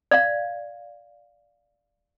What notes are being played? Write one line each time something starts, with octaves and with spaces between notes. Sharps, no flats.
D5 F5